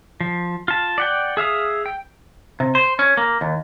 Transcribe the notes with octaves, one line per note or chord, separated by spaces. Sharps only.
F3
F4 A5
D5 F#5 G5
G#4 E5 F5 D#6
G5
C3
C5
C#4
A#3
D#2